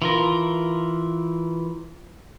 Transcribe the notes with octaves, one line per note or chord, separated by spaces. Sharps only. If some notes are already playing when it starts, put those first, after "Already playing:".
E3 F4 A#4